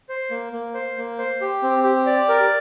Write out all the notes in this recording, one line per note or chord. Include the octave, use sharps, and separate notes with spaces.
C5
A#3
A#3
C5
A#3
C5
G4
C4
G4
D5
A#4